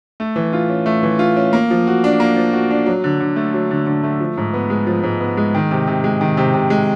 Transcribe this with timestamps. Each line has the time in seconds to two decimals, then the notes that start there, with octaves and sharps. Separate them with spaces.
0.20 A3
0.36 E3
0.53 F4
0.69 C#4
0.86 A3
1.03 E3
1.19 F4
1.37 C#4
1.53 A#3
1.70 F3
1.87 F#4
2.04 D4
2.20 A#3
2.36 F3
2.53 F#4
2.71 D4
2.86 F#3
3.04 D3
3.20 D3
3.36 A3
3.54 F#3
3.71 D3
3.86 D3
4.03 A3
4.20 F3
4.37 G#2
4.54 B3
4.70 G#3
4.87 F3
5.03 G#2
5.20 B3
5.37 G#3
5.55 D#3
5.71 C3
5.87 C3
6.04 G#3
6.21 D#3
6.37 C3
6.54 C3
6.70 G#3